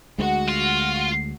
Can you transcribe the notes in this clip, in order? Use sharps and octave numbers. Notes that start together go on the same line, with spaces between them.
D2 G#3 F#4 F#5
F4